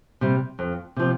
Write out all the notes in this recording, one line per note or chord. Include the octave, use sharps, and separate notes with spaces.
C3 G3
F2
C3 F3